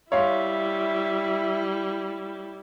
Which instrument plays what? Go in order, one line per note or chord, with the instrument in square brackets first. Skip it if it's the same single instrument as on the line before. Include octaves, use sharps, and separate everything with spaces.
[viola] G3 E4 [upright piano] C#5 F5 C6 [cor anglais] E5